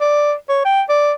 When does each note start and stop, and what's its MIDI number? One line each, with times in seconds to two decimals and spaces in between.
0.01 0.34 74
0.49 0.64 73
0.65 0.82 79
0.89 1.13 74